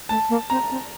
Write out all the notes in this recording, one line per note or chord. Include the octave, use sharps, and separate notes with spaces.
A3 A5
A#3
C4 A#5
C4